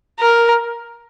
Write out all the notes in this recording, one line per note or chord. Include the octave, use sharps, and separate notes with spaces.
A#4